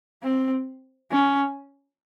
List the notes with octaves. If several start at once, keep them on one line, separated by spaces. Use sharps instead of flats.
C4
C#4